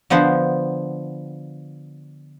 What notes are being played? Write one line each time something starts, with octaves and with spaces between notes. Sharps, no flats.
D3 F3 B3 C5